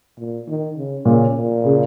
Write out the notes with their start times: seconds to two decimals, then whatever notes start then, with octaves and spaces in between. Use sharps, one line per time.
0.19 A#2
0.48 D#3
0.77 C#3
1.05 A#2 C#3
1.35 A#2
1.65 C#3